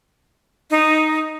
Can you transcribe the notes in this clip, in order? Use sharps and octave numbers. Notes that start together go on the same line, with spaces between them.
D#4